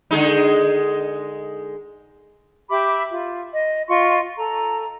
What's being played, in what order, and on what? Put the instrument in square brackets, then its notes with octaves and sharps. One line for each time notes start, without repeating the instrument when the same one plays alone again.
[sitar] D3 G#3 D#4
[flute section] G4 E5 B5 D6
F4
D#5
F4 D#5 C6 C#6
A4 A#5